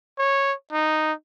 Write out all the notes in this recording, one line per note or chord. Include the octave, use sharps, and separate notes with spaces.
C#5
D#4